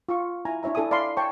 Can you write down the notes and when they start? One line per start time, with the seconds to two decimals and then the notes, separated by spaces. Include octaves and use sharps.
0.09 F4 C#6
0.45 E4 G#5 A#5
0.63 D4 E4 C#5 E5 A#5
0.75 D4 E4 A4 C#5 G#5 D#6
0.91 D5 F5 B5 C6
1.17 C#5 G5 A5 C#6